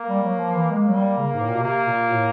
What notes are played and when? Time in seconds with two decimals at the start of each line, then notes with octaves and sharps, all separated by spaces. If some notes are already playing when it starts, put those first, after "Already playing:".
Already playing: A#3
0.08 G3
0.23 F#3
0.39 F3
0.55 E3
0.71 G#3 A#3
0.88 F#3
0.94 G3
1.18 C#3
1.33 G#2
1.41 A2
1.49 A#2
1.56 B2
1.63 C3 A#3
1.87 A#2
2.11 A2